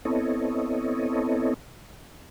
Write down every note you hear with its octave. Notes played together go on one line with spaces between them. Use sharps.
B3 C4 E4 A4 C#5 D#5